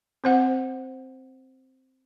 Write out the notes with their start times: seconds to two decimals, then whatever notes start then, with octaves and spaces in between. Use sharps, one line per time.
0.24 C4 C5 F#5